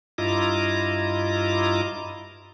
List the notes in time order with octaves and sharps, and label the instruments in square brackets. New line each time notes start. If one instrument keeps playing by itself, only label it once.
[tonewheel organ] G2 E4 F4 D#5 A#5 D6